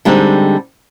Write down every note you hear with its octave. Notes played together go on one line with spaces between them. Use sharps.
D3 G3 G#3 C4 D#4